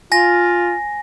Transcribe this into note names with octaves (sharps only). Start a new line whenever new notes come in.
F4 G#5 A#6